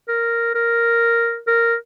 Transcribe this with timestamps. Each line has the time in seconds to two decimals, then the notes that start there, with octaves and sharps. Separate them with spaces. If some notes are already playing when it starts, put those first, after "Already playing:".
0.08 A#4
0.55 A#4
1.47 A#4